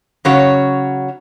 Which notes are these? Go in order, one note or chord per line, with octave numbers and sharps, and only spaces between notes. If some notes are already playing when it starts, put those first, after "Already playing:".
C#3 F#3 C#4 F#4 C#5